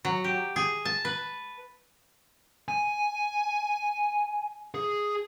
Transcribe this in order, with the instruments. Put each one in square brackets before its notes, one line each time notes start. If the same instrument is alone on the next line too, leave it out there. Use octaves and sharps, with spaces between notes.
[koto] F#3
G4
G#4
A5
B4
[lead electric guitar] G#5
G#4